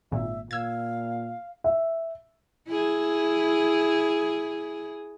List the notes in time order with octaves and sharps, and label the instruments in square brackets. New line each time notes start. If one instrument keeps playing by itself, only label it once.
[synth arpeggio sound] G#1 A#2 [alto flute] E5
[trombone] A#2 [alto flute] F5 [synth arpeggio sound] E6 G#6
[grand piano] E5
[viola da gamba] E4 G#4